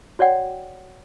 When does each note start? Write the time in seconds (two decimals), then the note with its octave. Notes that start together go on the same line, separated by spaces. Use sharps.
0.19 F#4 C#5 D5 F#5 G5